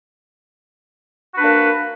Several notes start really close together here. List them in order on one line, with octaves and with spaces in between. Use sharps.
F#4 B4 D4 A#3